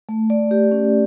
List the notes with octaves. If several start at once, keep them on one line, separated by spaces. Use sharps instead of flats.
A3
D5
G4
C#4